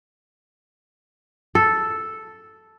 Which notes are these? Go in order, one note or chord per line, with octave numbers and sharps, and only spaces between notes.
A4